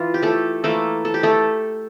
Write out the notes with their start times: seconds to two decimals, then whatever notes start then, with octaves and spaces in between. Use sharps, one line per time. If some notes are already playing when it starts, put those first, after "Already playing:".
Already playing: E3 F4
0.14 G4
0.22 A3 A4
0.64 E3 A3 A#3 A4
1.05 A4
1.14 G4
1.23 A3 A4